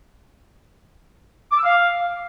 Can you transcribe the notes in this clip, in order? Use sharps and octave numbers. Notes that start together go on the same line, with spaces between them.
D6
E6
F5